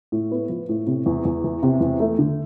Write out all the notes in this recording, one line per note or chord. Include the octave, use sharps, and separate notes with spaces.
A2
B3
F3
A2
C3
E2
E2
E3
C3
E2
A3
D3